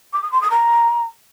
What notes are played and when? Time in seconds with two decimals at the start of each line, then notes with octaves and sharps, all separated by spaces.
0.13 D6
0.22 D#6
0.32 C6
0.41 D#6
0.51 A#5